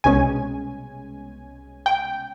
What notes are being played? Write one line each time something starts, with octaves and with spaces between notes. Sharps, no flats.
C2 B2 G#3 C#4 G#5
G5